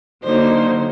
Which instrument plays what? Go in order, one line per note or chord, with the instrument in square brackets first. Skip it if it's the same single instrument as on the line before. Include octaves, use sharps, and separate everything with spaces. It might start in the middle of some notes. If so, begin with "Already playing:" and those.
[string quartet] D3 F#3 A#3 D#4 C5